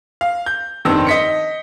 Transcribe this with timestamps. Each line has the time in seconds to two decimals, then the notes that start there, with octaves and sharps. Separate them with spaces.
0.21 F5
0.46 G6
0.85 F1 G2 D#3 C4 E6
1.07 D#5 B6 C#7